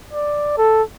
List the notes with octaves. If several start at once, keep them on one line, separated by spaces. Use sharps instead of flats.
D5
A4